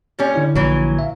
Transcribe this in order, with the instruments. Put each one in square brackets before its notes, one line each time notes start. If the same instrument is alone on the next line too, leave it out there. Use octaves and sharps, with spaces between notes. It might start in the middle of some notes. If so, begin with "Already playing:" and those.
[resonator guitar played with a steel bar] A#2 G3 C#4
[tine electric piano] D3 E4 C#5
[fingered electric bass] A#1 [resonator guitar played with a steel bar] E3 F#3
[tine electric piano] E5 F5